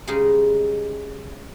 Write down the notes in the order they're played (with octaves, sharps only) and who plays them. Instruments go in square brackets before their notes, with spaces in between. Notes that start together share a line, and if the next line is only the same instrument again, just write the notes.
[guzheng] C#3 G3 G#3 D#4 G#4